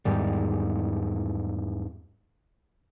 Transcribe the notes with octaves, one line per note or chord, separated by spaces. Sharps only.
E2 G#2 D#3 G3